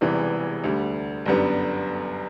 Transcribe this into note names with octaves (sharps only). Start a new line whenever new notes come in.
E1 E2 C3 E3 G3
D2 D3 G3
G1 F#2 D3 G3 B3